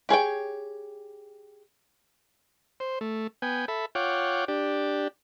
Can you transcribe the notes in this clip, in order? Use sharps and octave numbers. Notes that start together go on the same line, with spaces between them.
G4 G#4 C#5 G5
C5
A3
B3 G5 G#5
A4 E5 B5
F4 C#5 F#5 G5 D6
D4 G4